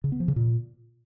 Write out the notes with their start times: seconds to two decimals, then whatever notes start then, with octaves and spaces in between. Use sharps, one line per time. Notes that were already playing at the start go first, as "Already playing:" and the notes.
0.04 C#3
0.12 B3
0.20 F3
0.28 C#3
0.36 A#2